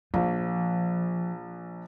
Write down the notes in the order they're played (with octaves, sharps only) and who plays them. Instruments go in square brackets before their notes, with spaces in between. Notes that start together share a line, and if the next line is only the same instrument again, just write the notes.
[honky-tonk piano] A#1 [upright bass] F3